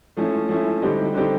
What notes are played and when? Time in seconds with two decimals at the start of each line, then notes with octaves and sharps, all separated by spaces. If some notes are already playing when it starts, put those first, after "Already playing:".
0.17 F3 A3 C#4 E4
0.49 F3 A3 C#4 E4
0.82 D3 G3 C4 D#4 G4
1.14 D3 G3 C4 D#4 G4